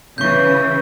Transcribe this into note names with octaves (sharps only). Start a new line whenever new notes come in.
C#3 E3 C#6 G6